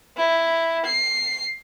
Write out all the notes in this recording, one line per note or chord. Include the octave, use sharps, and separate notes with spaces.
E4
C7